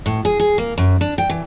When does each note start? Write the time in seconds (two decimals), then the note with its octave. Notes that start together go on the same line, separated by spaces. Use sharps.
0.06 A2
0.25 G#4
0.40 G#4
0.58 A#3
0.78 F#2
1.01 D4
1.18 G5
1.29 E3